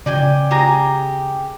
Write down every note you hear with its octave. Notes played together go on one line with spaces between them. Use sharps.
C#3 D5 G5 G#5
G4 G#4 A#5